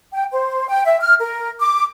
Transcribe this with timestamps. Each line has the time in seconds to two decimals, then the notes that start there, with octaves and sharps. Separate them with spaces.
0.13 G5
0.31 C5
0.68 G5
0.85 E5
1.00 F6
1.20 A#4
1.60 D6